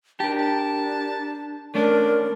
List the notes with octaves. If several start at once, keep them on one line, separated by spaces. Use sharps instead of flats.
D4 G4 A#4 A5
A5
A3 C#4 D4 A#4